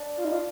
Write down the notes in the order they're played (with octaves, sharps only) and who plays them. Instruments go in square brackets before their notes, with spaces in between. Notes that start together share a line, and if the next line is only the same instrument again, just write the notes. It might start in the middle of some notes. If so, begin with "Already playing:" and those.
Already playing: [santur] D4
[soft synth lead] F4
D#4
F4